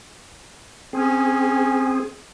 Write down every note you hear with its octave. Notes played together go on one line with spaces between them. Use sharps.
C4 C#4 G#4